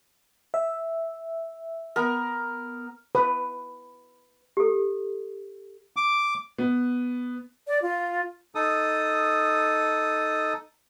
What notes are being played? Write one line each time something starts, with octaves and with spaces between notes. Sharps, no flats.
E5
B3 A#4
B4
G4 A4
D6
B3
D5
F4
D#4 A4 D#6